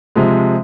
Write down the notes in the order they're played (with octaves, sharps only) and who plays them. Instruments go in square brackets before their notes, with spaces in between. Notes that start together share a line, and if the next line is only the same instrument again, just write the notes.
[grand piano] C3 F3 G#3